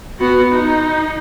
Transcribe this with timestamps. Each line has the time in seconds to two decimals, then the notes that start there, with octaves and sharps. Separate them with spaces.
0.19 B3 F#4
0.52 D#4